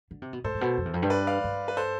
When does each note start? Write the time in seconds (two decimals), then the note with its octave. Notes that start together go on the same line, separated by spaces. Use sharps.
0.11 D3
0.22 C3
0.33 B2
0.44 A2 A4 C5
0.54 A2
0.61 B2
0.77 F2
0.85 E2
0.94 F2
1.02 G2
1.10 B4 D5
1.27 D5 F5
1.44 G2
1.68 B4
1.77 A4 C5